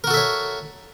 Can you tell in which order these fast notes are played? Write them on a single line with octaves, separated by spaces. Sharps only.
A#4 F#4 A4 E5 C#5